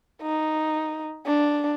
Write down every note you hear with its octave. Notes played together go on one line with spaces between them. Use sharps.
D#4
D4